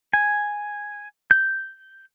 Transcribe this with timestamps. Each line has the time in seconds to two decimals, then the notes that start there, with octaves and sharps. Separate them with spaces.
0.13 G#5
1.31 G6